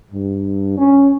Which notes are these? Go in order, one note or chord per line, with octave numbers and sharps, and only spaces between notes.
G2
C#4